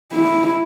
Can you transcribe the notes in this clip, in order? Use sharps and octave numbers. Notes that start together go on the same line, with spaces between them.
E4